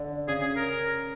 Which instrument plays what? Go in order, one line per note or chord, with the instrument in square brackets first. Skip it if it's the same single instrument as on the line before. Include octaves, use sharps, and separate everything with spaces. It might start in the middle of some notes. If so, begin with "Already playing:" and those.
Already playing: [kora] D3
[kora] C#3 [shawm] G#4
[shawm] G#4
A#4